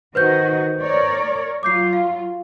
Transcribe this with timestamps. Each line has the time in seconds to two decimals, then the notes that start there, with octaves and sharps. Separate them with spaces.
0.15 D#3 F#4 B4 C5 D#5 G6
0.81 A#4 C#5 D5
1.63 F#3 F4 D6 G6 C7
1.93 F5